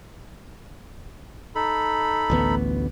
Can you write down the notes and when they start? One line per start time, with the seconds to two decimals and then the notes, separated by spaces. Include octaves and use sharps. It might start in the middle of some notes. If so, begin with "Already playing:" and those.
1.55 D#4 A4 B5
2.30 A1 D2 B3